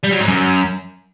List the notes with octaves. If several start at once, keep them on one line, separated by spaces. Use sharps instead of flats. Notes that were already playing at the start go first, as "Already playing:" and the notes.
G3
F#3
G#2
F#2